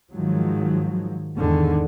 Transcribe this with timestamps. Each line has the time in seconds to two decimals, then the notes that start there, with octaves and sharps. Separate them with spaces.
0.14 G#2 D#3 F3 F#3 G#3
1.36 E2 G#2 D3 D#3 G#3